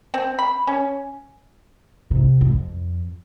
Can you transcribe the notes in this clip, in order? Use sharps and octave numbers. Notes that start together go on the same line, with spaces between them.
C4
B5
C#4
C3
F2